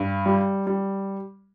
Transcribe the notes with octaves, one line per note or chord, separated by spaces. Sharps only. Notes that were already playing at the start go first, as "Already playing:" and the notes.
Already playing: G2
G3
G3